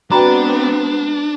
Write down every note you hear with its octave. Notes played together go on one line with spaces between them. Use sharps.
G#3 B3 C4 D4 F#4 G5 A#5 B5